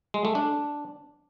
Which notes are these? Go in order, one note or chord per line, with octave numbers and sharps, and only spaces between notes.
G#3
A3
D4